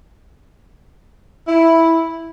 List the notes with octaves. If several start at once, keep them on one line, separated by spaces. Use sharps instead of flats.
E4